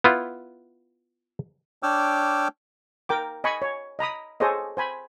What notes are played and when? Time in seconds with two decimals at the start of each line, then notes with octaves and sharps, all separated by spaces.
0.04 B3 E4 F4
1.83 D4 C#5 G5 D6 E6 F6
3.09 A#4 G5 D6
3.44 D#5 G#5 B5 C#6
3.62 C#5
3.99 D#5 A#5 B5 D#6
4.40 G#4 A4 C5 C#5 D#5
4.77 C5 G#5 B5